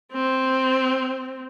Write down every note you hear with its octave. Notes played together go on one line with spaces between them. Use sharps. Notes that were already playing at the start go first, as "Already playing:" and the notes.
C4